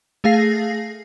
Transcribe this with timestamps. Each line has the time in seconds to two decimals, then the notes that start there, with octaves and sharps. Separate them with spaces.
0.24 A3 G#4 F5 A#6 C7